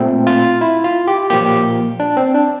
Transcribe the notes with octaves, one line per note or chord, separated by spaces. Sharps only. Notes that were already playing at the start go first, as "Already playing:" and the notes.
Already playing: A#2 A3 C4
F4
E4
F4
G4
A#2 F3 A#3 G4
D4
C4
D4